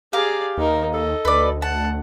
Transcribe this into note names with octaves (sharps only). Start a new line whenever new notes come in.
G4 G#4 D5 F5 A#5
D#2 D#4 A#4
A4 D#5
D2 B4 D5
F#5 A5